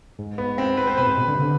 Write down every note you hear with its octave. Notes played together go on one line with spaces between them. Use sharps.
G#2
B3
C4
B4
C5
B2 B4
G#2
B2
D3
C3
D3